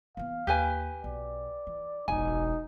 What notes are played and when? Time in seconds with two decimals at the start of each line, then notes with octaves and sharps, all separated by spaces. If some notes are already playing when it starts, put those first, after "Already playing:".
0.17 E3 B3 F5
0.47 D#2 G4 B4 G#5
1.04 B1 D5
1.67 E3
2.08 E1 A1 D#4 G#5